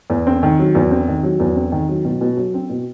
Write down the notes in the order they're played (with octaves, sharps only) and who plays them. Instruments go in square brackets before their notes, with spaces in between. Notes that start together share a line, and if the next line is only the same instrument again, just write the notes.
[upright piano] E2
C4
D#3
F#3
E2
C4
D#3
F#3
E2
C4
D#3
F#3
B2
B2
F#3
C4
B2